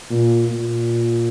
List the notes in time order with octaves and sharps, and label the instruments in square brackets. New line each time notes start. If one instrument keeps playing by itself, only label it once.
[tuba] A#2
A#2